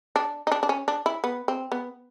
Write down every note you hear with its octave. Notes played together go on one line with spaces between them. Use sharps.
D4
D#4
D4
D4
C#4
D4
E4
B3
C4
B3